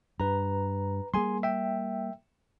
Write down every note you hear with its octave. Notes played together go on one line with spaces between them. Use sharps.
G2 B4 A#5
G3 A#3 G#4 G#5 C6
E5 G5